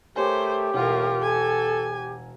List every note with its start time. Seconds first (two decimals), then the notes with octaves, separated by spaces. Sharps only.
0.16 A3 G4 A#4 C5 C#5 G#5
0.74 E1 A2 F4 A#4 F#5
1.22 A4 G#5